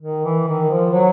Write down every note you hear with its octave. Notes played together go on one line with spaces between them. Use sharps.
D#3
E3
D#3
F3
F#3